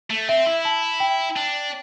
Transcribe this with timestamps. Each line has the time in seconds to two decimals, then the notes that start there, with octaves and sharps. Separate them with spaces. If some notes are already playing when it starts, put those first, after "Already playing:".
0.10 A3
0.28 C4 E5
0.46 E4
0.65 A5
1.00 G5
1.36 D4